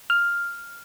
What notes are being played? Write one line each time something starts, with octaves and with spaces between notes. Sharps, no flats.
F6